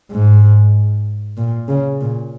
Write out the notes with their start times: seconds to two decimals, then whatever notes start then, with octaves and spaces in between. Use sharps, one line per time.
0.11 G#2
1.37 A#2
1.68 C#3
2.01 A#2